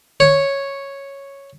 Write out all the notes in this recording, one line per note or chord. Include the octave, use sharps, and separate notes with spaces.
C#5